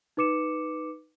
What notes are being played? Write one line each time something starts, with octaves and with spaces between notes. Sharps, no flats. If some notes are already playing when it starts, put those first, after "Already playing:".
D#4 B4 D6 C#7 E7